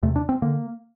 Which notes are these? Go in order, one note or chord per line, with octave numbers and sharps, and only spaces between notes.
E2 C3 A3
D4
C4
D3 A#3